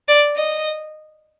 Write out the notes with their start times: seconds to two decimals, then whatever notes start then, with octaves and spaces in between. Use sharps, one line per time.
0.08 D5
0.37 D#5